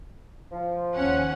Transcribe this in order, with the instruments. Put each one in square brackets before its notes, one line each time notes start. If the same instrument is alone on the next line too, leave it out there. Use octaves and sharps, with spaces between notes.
[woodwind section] F3
[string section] D#2 C#4 F#5